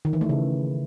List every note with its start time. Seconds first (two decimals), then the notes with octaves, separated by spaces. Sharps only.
0.05 D#3
0.13 E3
0.21 A3
0.29 C#3